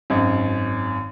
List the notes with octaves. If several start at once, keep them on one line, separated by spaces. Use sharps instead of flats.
G#1 F#2 D#5